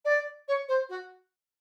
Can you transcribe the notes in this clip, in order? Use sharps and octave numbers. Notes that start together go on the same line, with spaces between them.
D5
C#5
C5
F#4